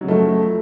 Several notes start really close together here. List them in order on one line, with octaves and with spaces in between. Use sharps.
F#3 C#3 F#2 A3 F3